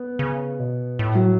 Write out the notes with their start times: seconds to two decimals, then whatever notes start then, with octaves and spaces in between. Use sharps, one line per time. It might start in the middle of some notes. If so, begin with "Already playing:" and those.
Already playing: B3
0.19 C#3
0.60 B2
0.99 A2
1.15 F#3